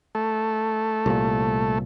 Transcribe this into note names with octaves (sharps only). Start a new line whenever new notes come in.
A3
C2 A#2